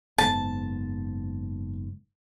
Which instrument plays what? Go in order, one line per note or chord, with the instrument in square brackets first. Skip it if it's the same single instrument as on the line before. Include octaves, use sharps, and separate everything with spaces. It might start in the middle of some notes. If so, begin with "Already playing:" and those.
[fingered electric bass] F#1 G#2 B3 [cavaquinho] A5